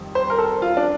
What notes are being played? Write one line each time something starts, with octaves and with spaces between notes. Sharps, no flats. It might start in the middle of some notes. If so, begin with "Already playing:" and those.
Already playing: F2 D#3 G3
C5
A#4
A4
F4
D4